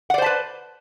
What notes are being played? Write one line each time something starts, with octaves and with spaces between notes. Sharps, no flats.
B4 C5 D5 F#5 A5